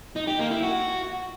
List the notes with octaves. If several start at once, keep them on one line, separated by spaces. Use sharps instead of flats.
D#4
G4
A#3
E4
F#4